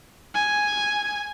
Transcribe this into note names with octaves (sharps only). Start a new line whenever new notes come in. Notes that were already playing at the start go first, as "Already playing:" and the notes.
G#5